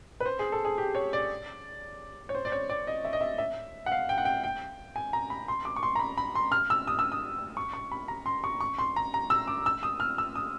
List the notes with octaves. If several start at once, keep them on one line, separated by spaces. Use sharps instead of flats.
B4
C5
G#4
A4
G#4
G4
C#5
D5
C#5
C5
D5
C#5
D5
D#5
E5
D#5
E5
E5
F#5
F5
G5
F#5
G5
G5
G#5
A#5
B5
C6
D6
C#6
C6
A#5
B5
B5
C6
F6
E6
D#6
E6
D#6
C#6
C#6
B5
A#5
C6
C#6
C#6
C6
A#5
A#5
E6
D6
E6
D#6
F6
E6
D#6